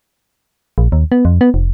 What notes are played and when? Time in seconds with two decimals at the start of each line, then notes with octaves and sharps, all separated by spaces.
0.78 A#1
0.92 D#2
1.12 B3
1.25 F2
1.41 B3
1.54 F1